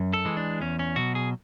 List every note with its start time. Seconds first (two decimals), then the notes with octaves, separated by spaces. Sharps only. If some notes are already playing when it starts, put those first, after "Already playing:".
Already playing: F#2
0.13 A4
0.25 E3 G#3
0.37 D4
0.61 E2 C#4
0.79 C#4
0.96 B2 F#3 F#4
1.15 G#4